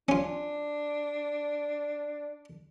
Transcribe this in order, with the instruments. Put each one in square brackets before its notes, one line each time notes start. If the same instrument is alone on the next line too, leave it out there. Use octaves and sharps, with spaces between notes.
[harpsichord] C#4 F4 [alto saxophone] D4